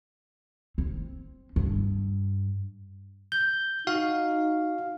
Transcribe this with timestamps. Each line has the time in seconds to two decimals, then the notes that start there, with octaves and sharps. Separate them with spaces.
0.78 C4
1.56 G2
3.32 G6
3.87 D#4 F#4 F5